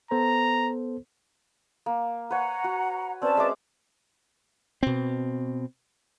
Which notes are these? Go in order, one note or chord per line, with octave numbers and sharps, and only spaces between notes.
B3 A4 C5 A#5
A#3
B4 C#5 F#5 A#5
F#4
C4 C#4 B4 D5 A5
G#3 E5 D6
B2 C4